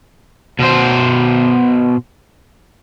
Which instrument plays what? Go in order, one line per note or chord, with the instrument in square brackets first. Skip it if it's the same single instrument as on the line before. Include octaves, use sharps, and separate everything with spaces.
[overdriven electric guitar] B2 C5